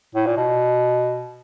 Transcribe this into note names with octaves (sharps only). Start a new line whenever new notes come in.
A2
A#2
B2